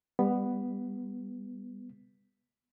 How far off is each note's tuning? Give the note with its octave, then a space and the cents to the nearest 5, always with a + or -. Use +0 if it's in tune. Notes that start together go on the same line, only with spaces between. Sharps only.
G3 +25 B3 +0